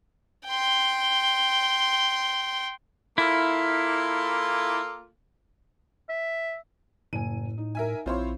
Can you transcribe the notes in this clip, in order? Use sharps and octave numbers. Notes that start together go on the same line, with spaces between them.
G5 C6
A#3 E4 F4 A4
E5
F#1 A2 G#5 D#7
D#4
A#4 E5 G#5
A#1 C4 E4 F4 C5 C#5 F5